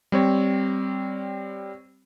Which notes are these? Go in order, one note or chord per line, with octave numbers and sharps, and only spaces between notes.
G3 C4 C#5